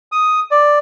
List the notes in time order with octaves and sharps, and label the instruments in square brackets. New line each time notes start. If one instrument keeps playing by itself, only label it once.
[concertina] D#6
D5